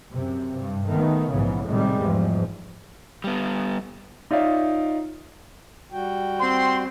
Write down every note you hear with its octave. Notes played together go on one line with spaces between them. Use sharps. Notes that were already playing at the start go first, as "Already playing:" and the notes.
F#2 C3
G2
D#3 A3 B3
A#1 G#2 C#3 E3 B3
A2 C3 D#3 G3 G#3
E2 G#2 F3
G3 B3
D#4 F4 C#5 D5 E5 F5
G3 F#4 G5
C4 C6